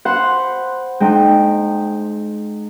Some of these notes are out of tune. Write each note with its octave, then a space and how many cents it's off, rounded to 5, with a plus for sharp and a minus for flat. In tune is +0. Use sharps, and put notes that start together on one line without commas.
C5 +0 F#5 +0 B5 +0
G#3 +30 D#4 -25 G5 +0